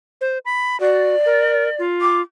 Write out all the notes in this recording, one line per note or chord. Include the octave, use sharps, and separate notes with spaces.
C5
B5
F#4 D5
A#4
F4
D6